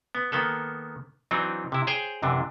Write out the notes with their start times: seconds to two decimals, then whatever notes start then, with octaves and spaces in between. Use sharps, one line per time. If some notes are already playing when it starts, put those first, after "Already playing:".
0.15 B3
0.32 D#3 A#3 B3 A4
1.31 E3 F#3 C4 D4 D#4
1.72 C3 E4
1.87 G#4 C5 C#5 G5
2.22 F#2 C3 E3 D4